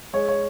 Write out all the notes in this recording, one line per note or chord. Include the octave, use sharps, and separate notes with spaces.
G#3 C#5
C#5